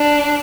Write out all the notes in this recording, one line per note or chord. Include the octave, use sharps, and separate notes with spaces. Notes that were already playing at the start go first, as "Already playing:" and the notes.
Already playing: D4